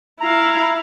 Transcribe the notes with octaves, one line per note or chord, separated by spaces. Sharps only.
E4 F5 A#5